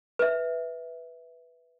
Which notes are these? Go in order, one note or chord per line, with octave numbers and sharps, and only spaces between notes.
B4 E5